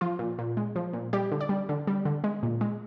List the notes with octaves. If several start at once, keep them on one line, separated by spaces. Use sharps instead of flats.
F3 F4
A#2
A#2
G#3
F3
A#2
G3 G4
D3
D5
G3
D3
G3
D3
G#3
A#2
G#3